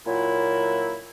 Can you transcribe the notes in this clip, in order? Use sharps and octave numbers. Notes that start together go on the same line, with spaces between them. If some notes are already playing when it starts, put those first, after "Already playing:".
A#2 F#3 E4